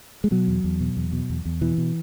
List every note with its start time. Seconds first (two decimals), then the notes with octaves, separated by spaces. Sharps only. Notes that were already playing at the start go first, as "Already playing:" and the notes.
0.24 G#3
0.31 B2 F#3
0.48 E2
0.64 E2
0.80 B2
0.97 E2
1.12 B2
1.30 E2
1.45 E2
1.61 B2 E3
1.78 B2